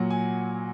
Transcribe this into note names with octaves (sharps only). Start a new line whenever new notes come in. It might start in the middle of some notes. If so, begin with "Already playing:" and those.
Already playing: A#2 F#3 F#5
G#5